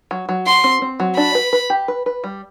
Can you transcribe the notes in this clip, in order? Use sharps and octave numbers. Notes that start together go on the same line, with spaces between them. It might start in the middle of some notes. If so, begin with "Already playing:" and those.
F#3
F#3
F#4 C6
C4
C4
F#3
D4 B5
B4
B4
G4
B4
B4
G3